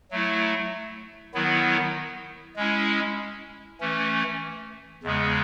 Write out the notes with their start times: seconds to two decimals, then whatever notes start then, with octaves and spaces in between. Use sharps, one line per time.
0.11 F#3 A3 E4
1.34 D#3 F#3 B3 E4
2.56 G#3 C#4 E4
3.80 E3 A3 C#4
5.03 E2 C#3 G#3 B3